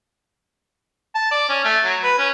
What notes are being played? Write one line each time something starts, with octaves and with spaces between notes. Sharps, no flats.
A5
D5
C#4
A3
F#3
B4
C#4